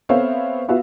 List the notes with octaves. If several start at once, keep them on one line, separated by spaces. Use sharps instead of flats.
B3 C4 A4 C#5 E5 F5
B3 F4 F#4 E5 F5